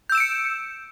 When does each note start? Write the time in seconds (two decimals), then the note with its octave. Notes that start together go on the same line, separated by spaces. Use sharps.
0.10 G6
0.12 E6
0.15 E7
0.18 D7
0.20 C#7